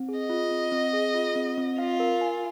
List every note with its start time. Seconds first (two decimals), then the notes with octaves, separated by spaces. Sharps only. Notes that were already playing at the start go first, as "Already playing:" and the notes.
Already playing: C4
0.09 G#4
0.19 D#5
0.29 F4
0.51 C4
0.72 C4
0.93 G#4
1.15 F4
1.36 C4
1.57 C4
1.78 F4 F5
2.00 A#4
2.21 G#5